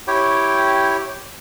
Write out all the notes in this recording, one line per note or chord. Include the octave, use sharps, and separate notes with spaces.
E4 G4 C#5 G5